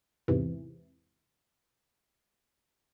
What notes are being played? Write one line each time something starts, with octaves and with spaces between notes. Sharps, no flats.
E2 G#2 C3 E3